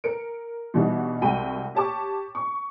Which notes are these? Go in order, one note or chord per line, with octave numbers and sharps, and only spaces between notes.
A#4 C#7 D7
B2 E3 G3 D4 D#4 F#4
C2 G#3 F#4 G5 B5 D#7
G4 C#5 A5 C#6 D6
C#6